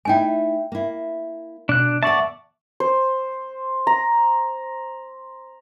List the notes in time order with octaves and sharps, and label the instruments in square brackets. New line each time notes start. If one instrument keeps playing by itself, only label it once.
[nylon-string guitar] A3 D#4 E4 [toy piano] G5 G#5
[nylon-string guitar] A#3 E4
[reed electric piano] B2 [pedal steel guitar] D4 F#6
[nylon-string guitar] A#3 F#5 [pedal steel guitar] D5 A5 [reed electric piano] E5 C#6
[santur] C5
A#5